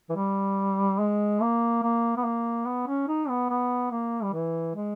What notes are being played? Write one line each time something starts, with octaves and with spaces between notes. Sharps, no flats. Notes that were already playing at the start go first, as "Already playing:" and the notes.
E3
G3
G#3
A#3
A#3
B3
A#3
B3
C#4
D#4
B3
B3
A#3
G3
E3
G#3